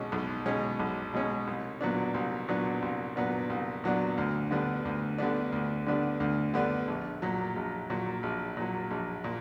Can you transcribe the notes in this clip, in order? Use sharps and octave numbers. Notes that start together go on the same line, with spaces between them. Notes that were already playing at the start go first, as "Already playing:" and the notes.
Already playing: B1 B2 G#3 C#4
B1
B2 G#3 C#4
B1
B2 G#3 C#4
C2
A#2 F#3 B3 D4
C2
A#2 F#3 B3 D4
C2
A#2 F#3 B3 D4
C2
A#2 F#3 B3 D4
D2
D3 G3 B3 D4
D2
D3 G3 B3 D4
D2
D3 G3 B3 D4
D2
D3 G3 B3 D4
A#1
A#2 F#3
A#1
A#2 F#3
A#1
A#2 F#3
A#1
A#2